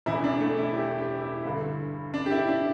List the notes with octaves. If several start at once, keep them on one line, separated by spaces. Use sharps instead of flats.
E1 E2 E3 E4
D4
A3
E4
G4
G4
E4
G1 G2 D3
D4
G4
E4
D4